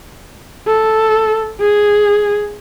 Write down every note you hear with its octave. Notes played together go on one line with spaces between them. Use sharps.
A4
G#4